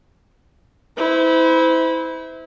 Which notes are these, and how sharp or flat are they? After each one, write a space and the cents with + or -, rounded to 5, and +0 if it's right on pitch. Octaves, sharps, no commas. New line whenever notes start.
E4 -25 C5 -35